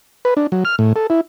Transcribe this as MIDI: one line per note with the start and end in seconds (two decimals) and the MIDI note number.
0.25 0.34 71
0.37 0.47 62
0.52 0.64 54
0.65 0.76 89
0.79 0.93 45
0.96 1.07 69
1.10 1.21 64